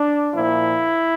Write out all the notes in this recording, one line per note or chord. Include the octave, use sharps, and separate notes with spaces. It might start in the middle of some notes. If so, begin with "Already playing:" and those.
Already playing: D4
A#2 F3 E4